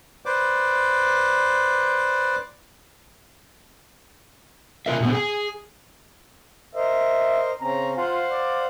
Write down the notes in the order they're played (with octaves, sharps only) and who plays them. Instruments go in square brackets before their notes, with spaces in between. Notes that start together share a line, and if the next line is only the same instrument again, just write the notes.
[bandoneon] B4 C5 D5 D6
[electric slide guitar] C3 F4 A#4 E5
A#2 D3 E3 B3 C4
G#4 G5 G#5
[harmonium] A#4 C5 D#5 [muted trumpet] E5
[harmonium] C#3 C4 C#4 [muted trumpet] A#5
[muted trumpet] F4 [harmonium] C5 F5 F#5
[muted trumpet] D5